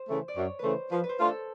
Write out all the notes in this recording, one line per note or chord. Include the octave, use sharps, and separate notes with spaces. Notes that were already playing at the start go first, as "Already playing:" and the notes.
Already playing: C5
C#3 E3 A3
D5
F#2 C#5
C#3 E3 A3 B4 C5
F3 B4
B4
C5
A3 D4 F4
A4